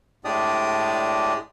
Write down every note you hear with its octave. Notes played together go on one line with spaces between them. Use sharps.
A2 G#3 D4 G4 D5 D#6